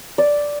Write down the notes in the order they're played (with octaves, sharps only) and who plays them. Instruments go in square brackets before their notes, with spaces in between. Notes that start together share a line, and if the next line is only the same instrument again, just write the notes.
[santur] D5